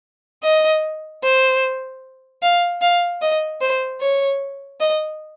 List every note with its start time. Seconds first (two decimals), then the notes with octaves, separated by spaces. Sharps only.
0.43 D#5
1.23 C5
2.43 F5
2.82 F5
3.22 D#5
3.61 C5
4.00 C#5
4.80 D#5